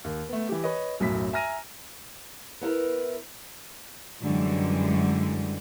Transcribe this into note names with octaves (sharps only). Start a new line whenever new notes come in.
D#2
A3 B3
E3 G4
B4 C#5 D#5
B1 F#2 A2 B6
E5 G#5 A#5 F6 A#6 D#7
B3 E4 A#4 B4
F#2 D3 E3 G3 G#3